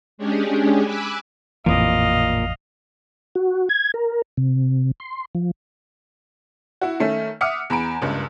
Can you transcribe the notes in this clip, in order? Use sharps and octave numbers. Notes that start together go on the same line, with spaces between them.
G#3 C#4 D4 G4 G#4
G#5 B5 D6 E6 F#6
A1 F2 A#2 E3 D#5 F5
F#4
G#6
A#4
C3
C6
F3
E4 F#4
D#3 A3 C#4
E5 F#5 D6 D#6 F6 C#7
E2 A#5 B5 D7
F#1 C#2 G2